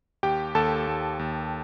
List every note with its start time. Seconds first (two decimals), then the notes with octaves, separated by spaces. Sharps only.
0.23 D#2 G4 G5
0.55 D#2 A4 A5
0.87 D#2
1.19 D#2